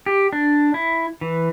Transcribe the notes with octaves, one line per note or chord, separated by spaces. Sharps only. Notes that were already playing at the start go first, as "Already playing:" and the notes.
G4
D4
E4
E3